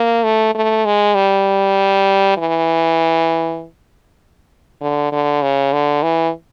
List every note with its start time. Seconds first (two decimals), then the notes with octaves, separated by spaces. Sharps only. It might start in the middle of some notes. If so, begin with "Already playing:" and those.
Already playing: A#3
0.24 A3
0.55 A3
0.86 G#3
1.15 G3
2.37 E3
4.81 D3
5.12 D3
5.42 C#3
5.73 D3
6.03 E3